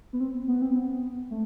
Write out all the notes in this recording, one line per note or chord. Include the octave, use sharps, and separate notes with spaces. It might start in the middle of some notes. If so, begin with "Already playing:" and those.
B3
C4
B3
C4
B3
A3